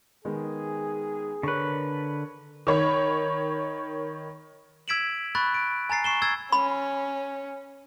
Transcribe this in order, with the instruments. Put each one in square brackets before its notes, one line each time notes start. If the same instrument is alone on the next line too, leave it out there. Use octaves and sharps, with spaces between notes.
[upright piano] D#3 G#3 B3 [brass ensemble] G#4
[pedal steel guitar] D3 B4 [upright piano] A#4 C#5 C#6
[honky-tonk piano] D#3 C#5 B5
[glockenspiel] E6 G#6 B6 D7 E7 F#7
B5 C#6 F#6 A6
D7
G#5 A#5 A6 C7
C#6 C7 E7 G7
E6 G#6 A6
[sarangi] C#4 [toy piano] B5